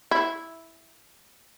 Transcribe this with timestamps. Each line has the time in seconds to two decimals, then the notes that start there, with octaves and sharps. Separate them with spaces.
0.11 E4